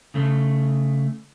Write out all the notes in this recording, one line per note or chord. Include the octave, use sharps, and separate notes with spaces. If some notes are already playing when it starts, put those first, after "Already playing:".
C#3 A3